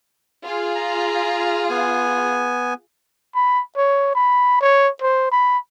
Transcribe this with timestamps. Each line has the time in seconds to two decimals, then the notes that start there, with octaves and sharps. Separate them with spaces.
0.42 F4 G#4
0.75 A#5
1.70 B3 G#5
3.35 B5
3.77 C#5
4.15 B5
4.61 C#5
5.01 C5
5.31 B5